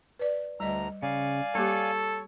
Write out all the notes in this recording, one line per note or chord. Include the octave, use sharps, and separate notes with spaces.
B4 D5
D2 G3 D#5 A#5
C#3 D5 F5 G#5
G3 A#3 G4 A4 C#5